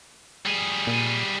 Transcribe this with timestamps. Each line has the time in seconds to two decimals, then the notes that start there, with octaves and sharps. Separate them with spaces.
0.45 G3 G#4
0.87 A#2